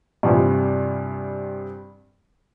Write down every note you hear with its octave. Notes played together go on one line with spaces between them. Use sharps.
G2 C3 E3 F3